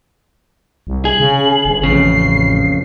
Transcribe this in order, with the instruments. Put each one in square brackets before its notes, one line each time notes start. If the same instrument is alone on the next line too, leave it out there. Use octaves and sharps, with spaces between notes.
[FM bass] C2
[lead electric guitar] G#4 [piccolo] F#7
[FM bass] C#3
G1
[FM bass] A1 [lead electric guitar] F2 C#3 [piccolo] C7